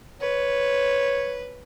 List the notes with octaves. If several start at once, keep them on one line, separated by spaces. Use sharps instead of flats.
B4 C#5